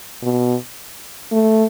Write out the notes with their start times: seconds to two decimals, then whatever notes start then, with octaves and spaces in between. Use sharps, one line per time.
0.22 B2
1.32 A3